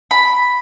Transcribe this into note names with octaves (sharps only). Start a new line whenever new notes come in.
B5